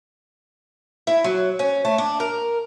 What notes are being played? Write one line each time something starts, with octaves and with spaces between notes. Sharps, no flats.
E4
F#3
C#4
A3
D4
A#4